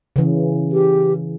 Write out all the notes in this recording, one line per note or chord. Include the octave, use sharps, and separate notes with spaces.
C#3 E3
G4